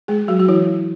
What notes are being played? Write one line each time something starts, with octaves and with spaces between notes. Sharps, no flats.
G#3 G#4
F#3 F#4
F#4
E3 E4